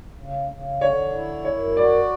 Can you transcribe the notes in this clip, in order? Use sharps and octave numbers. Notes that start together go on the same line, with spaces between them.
C#3
C#3
D3 C#5
E4
F#2 C#5
F#4 D5